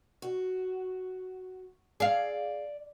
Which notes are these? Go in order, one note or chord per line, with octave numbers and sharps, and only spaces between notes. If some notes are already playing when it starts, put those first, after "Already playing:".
F#4
G#4 D5 F5